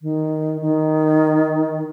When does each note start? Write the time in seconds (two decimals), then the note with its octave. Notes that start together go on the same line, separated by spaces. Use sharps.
0.02 D#3
0.61 D#3